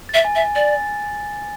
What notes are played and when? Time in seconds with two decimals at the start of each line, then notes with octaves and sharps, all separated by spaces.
0.09 E5 A6
0.25 G#5
0.35 E5
0.40 G#5
0.56 D5 A6